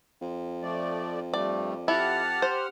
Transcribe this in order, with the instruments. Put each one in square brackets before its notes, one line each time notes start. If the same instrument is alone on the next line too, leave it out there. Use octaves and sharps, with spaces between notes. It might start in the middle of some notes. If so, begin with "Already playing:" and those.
[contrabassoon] F2
[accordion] F3 A3 D5
[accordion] G2 G3 A3 [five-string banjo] D5
[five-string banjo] E4 [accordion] G4 F#5 F6 [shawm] A5
[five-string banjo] C5